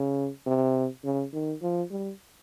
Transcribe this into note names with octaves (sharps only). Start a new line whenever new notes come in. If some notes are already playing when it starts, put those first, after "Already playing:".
Already playing: C#3
C3
C#3
D#3
F3
G3